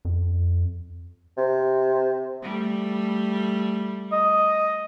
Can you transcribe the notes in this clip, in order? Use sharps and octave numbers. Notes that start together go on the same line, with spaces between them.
F2
C3
G3 A3
D#5